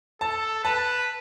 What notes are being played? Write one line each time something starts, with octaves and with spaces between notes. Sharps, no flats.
A4 A5
B4 A5